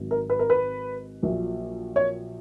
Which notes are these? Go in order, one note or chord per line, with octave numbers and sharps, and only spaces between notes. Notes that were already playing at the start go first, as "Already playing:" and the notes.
Already playing: G#1 G#2 F#3
A#4
B4
A#4
B4
A#1 A#2 F#3
C#5